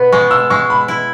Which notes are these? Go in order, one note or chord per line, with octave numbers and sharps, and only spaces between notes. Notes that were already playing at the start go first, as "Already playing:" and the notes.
Already playing: B2 B3
G#3 C#6
E6
G#3 C#6
B5
E4